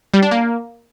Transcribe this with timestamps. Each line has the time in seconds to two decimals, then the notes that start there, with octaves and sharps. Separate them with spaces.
0.14 G3
0.22 D4
0.31 A#3